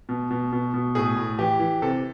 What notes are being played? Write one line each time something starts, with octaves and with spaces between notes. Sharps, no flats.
B2
B2
B2
B2
A2 G#4
A2
E3 G4
E3
C3 A4